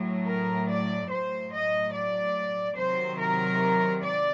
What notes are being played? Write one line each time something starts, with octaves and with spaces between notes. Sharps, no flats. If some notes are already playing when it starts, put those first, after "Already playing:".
Already playing: A2 F#3
A#4
D5
A2 F#3 C5
D#5
D5
C3 D#3 F#3 C5
A#4
D5